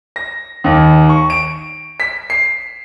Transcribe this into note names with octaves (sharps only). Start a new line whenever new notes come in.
A#6
D#2
C#6
D7
B6
C7